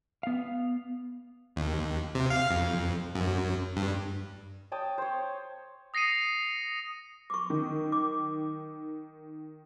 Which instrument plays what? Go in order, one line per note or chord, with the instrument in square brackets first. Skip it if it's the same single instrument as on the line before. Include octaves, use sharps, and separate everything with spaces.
[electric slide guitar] B3 F5
[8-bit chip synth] D#2
C3
F5
F2
F#2
G2
[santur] C#5 G5 A5 D#6
C5 C#5
[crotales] D#6 A#6 C7 C#7 D#7
[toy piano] C#6 D6
[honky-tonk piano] D#3
[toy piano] D6